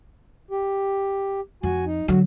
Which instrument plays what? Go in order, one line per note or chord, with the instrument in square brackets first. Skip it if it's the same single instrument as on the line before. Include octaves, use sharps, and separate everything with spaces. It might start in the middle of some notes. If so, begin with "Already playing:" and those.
[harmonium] G4
[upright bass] F2 [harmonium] F#4 G#5
[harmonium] D#4
[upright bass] D3 F#3 [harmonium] F#4